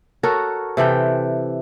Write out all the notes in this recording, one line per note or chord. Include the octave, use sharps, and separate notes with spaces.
F#4 A4 A#4 C#5
C3 E3 A4 G5